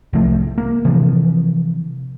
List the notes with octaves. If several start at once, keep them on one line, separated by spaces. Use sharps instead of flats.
C2 F3 A3
A#3
C3 E3 F3